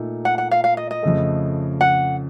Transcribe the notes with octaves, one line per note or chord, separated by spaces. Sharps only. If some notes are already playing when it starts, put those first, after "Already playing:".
Already playing: A#2 A3 D#4
F#5
F#5
F5
F5
D#5
D#5
F2 C#3 A3
F#5